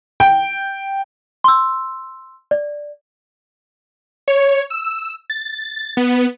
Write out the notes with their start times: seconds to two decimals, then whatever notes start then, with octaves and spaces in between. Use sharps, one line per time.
0.20 G5
1.44 C6 E6
2.51 D5
4.28 C#5
4.70 E6
5.30 A6
5.97 B3